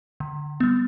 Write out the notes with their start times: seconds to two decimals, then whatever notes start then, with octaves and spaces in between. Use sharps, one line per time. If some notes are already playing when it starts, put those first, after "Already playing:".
0.20 D3
0.60 G3 B3